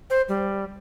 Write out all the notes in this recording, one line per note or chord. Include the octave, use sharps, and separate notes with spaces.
C5
G3